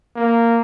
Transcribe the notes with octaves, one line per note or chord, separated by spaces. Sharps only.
A#3